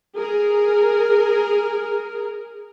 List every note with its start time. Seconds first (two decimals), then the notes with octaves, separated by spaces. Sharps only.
0.18 G#4 A#4